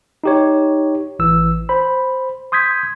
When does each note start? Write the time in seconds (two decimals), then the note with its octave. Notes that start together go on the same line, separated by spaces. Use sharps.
0.24 D#4 G4 C#5
1.19 A1 E3 E6
1.69 C5 B5
2.52 C6 D#6 G6 G#6 B6